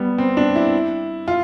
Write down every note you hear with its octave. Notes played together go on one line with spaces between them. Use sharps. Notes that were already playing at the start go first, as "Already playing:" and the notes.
Already playing: G3 B3
C4
D4
E4
F4